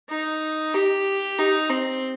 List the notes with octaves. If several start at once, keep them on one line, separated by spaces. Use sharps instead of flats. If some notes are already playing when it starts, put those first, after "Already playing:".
D#4
G4
D#4
C4